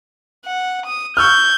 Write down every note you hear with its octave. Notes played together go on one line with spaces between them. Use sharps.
F#5
D#6
C#6 E6 F6 G6 G#6